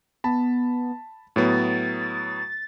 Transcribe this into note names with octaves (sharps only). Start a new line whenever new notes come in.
B3 A5 B5
A2 F#3 B3 A6